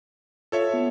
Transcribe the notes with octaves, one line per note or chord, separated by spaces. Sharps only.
F4 A4 C#5 E5
B3